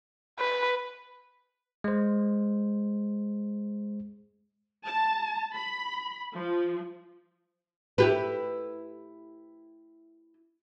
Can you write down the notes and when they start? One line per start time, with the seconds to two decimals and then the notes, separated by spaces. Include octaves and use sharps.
0.39 B4
1.84 G#3 C5
4.86 A5
5.54 B5
6.33 F3
7.98 E4 G4 B4